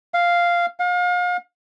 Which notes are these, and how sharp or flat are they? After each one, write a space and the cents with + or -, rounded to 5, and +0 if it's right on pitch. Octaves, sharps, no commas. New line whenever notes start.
F5 -5
F5 +35